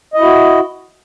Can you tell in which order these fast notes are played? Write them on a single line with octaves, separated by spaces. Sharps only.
D#5 E4 F#4